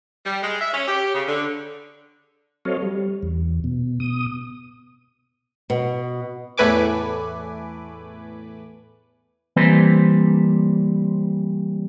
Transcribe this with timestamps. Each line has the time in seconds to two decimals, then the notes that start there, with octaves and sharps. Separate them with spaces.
0.25 G3
0.43 G#3
0.60 E5
0.73 C#4
0.88 G4
1.14 C#3
1.28 D3
2.65 F#3 C4 A4 C#5 D#5 F5
2.82 G3
3.23 E2
3.64 B2
4.00 B2 D#6
5.70 B2
6.57 E2 A2 A3 B4 G#5 D6
9.56 E3 G3 A#3 C4 B4 C5